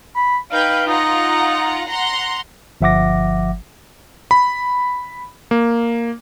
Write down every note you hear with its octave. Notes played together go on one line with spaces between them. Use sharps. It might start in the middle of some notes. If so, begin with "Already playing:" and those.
B5
D#4 B4 F5 G5
D#4 F4 F#5 A#5
F#5 A#5 C6
G1 F3 E5 F#5 D6 A#6
B5
A#3